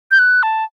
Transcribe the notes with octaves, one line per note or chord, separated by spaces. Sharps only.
G6
F#6
A5